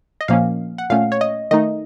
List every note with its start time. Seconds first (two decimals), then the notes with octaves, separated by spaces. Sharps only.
0.21 D#5
0.28 A#2 F3 A#3 C#4 F5
0.78 F#5
0.90 A#2 A3 C#4 F5
1.12 C#5
1.21 D#5
1.51 D#3 A3 D#4 D#5